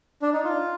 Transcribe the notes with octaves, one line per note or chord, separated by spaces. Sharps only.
D4
D#4
F4